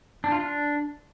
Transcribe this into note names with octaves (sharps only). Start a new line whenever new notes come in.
D4
F4
D4